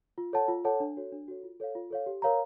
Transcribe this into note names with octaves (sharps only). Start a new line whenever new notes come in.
F4
A4 C#5 F#5 A5
F4
A4 C#5 F#5 A5
D4
F#4 A4 C#5
D4
F#4 A4 C#5
F4
A4 C#5 F5
F4
A4 C#5 F5
G4
A#4 C#5 F5 A#5